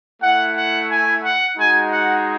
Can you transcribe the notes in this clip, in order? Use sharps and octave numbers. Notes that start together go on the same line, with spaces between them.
A3 E4 F#5
F#5
G#5
F#5
G#3 D#4 F#4 G#5
F#5